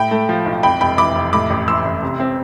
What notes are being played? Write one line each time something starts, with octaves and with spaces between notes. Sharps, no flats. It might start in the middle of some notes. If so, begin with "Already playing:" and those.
Already playing: A2 G5 B5
A3
F3
B1
F2 G5 B5
F1 G5 B5
E3 B5 D6
F1
A2 B5 D6
A1
E3 C6 E6
A1
C3
C4